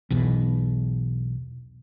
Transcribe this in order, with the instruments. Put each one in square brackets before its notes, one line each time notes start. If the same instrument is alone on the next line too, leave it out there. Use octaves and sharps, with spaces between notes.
[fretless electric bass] B1 E2 B2